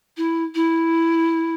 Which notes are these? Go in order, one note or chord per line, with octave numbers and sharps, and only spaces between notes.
E4
E4